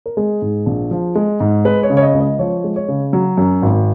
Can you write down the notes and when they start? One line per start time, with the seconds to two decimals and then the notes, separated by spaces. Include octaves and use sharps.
0.06 A#4
0.17 G#3 G#4
0.42 G#2
0.66 A#1
0.91 F3
1.15 G#3
1.40 G#2
1.65 G#3 B4
1.83 C#5
1.90 C#3
1.97 C#5
2.02 D#5
2.14 C#2
2.20 D#5
2.39 F3 C#5
2.64 G#3
2.76 C#5
2.88 C#3
3.13 F#3
3.38 F#2
3.62 G#1